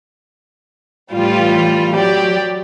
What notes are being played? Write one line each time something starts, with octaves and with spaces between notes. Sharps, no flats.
A2 E3 G3 F4
F#3 G4 D5